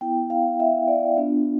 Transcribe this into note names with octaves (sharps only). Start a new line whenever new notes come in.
B3 E4 G5
F5
E5
D5
B3 D4 F4